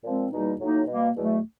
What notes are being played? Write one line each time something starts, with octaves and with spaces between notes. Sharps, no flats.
A#2 F3 G#3 C4
E2 B2 G3 A#3 D#4
A2 F#3 A#3 D#4
B2 G3 A#3
E2 B2 F#3 A3